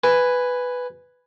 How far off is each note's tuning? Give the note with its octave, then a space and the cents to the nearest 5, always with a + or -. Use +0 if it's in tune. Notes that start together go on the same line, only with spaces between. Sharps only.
B4 +5 G#5 -5